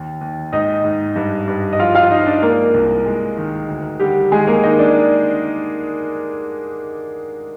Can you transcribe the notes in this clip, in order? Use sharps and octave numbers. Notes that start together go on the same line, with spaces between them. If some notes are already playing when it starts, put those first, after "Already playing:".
Already playing: D#2
D#2
G#2 D#4 D#5
G#2
G2
G2
D#5
F3 F4 F5
F4 F5
F3 D#4 D#5
D4 D5
G#3 A#3 A#4
C2
G#3
D#3
D2
D3 G3 G4
D#3 G#3 G#4
A#3 A#4
D#3 D#4 D#5
D4 D5